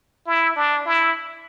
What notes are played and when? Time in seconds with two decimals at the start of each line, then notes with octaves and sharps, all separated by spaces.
0.27 E4
0.56 D4
0.85 E4